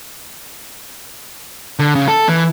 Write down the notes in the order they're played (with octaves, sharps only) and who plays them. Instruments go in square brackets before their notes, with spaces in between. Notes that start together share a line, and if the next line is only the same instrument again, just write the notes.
[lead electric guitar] D3
C#3
A4
E3